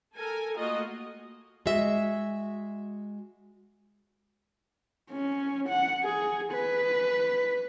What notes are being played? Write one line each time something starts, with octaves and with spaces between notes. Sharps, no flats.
A4 A#4 G#5
A3 A#3 F4 F#4 D#5
G#3 F#4 D#5 E5
C#4
F#5
G#4
B4